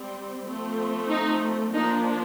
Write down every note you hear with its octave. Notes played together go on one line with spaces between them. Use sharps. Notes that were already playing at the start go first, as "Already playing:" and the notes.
Already playing: G3 C4
F3 A3 C4
D#4
F3 A#3 D4 D#4